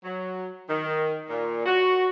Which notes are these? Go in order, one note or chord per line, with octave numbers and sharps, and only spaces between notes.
F#3
D#3
A#2
F#4